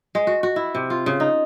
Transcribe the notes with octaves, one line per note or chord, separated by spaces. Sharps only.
G#3
F#4
F#4
E4
C3
F4
C#3
D#4